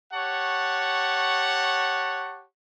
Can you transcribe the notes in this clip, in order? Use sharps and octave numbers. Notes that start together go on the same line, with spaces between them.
G4 C#5 F#5 A5 C#6